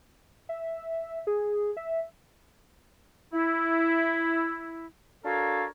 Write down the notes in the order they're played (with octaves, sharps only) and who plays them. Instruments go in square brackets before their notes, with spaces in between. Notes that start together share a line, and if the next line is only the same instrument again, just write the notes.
[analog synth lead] E5
G#4
E5
[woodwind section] E4
D4 F#4 A4 A#4 C#5 F5